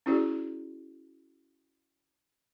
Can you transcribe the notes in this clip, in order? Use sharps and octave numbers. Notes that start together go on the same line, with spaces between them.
C#4 E4 F#4 G#4 D5